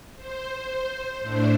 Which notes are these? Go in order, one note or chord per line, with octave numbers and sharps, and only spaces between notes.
C5
A2 A3 D4 C5